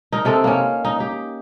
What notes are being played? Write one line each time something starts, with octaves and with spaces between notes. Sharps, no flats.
D#4 A#4
C3 C4 D#4 A4
A#3 C#4
D#4
D#4 G4